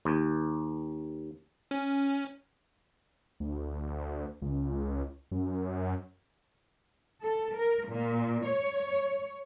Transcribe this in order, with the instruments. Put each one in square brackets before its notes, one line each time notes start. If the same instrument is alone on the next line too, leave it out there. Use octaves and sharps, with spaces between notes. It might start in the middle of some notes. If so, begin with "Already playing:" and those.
[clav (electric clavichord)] D#2
[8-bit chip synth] C#4
[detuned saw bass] D2
C#2
F#2
[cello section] A4
A#4
A#2
C#5